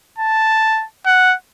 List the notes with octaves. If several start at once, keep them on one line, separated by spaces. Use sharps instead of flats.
A5
F#5